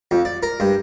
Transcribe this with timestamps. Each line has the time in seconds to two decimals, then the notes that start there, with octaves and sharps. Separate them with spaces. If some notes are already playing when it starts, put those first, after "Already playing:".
0.11 F2
0.25 D5
0.43 A#4
0.60 G2